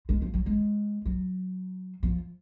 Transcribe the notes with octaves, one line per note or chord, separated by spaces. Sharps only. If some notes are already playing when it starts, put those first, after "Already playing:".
G#3
F3
F#3
G#3
F#3
F3